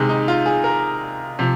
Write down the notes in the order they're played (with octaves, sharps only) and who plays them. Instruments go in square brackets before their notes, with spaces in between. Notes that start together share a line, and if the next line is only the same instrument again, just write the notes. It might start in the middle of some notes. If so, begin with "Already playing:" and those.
Already playing: [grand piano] C3 D#3 G#3
D#4
F4
G#4
A#4
C3 F3